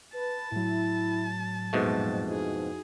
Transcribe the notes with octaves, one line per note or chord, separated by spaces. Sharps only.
B4 A5
A2 F#3 E4
F2 G#2 B2 A3
D#4 E4 F#4 G#4